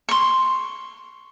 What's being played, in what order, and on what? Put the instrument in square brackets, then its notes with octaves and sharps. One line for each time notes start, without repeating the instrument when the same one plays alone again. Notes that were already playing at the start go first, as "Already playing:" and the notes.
[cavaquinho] C6 C#6